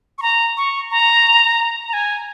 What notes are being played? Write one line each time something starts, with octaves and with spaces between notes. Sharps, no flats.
C#6
A#5
C#6
A#5
A#5
G#5